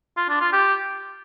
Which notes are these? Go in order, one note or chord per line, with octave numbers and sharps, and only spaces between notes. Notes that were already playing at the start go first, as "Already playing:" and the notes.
F4
D4
F4
G4